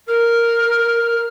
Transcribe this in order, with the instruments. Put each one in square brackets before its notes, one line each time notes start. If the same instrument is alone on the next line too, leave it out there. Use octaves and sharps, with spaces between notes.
[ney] A#4 [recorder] F6